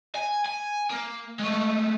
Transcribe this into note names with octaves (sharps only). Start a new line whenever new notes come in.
G#5
G#5
A#3
G#3 A3